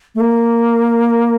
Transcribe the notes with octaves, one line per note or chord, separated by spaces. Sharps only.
A3
A#3